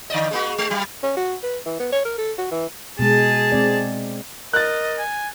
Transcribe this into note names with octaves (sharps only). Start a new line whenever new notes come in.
D3 D5 D#5
G#3 A#3 F#4
G#3
F#3 G4
C#4
F#4
B4
E3
B3
C#5
A#4
A4
F#4
E3
B2 G#3 G#4 A5
G#3 C4 D5
A#4 D#5 F#6 A6
G#5